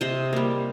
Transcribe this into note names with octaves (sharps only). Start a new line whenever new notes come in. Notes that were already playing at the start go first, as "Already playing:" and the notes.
C3 C5 D#5
G3 A#3